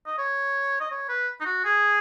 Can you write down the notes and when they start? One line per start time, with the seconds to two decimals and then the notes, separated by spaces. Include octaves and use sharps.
0.06 D#5
0.18 C#5
0.80 D#5
0.91 C#5
1.09 B4
1.41 D#4
1.45 F#4
1.65 G#4